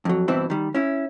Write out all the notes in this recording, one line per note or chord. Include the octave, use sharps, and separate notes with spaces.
F2 F#3
G2 B2 E3 C4 E4
D#3 G3
C#4 E4